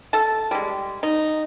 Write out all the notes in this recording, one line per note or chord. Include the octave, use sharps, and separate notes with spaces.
A4 A5
G3 G#3
D#4